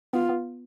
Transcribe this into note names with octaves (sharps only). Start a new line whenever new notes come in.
B3 F4
B3